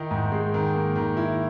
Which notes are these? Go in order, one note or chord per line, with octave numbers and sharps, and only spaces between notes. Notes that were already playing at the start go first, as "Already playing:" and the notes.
Already playing: D#3 D#4 E4
G#2
G#3
D#3
A#3
D#3
E4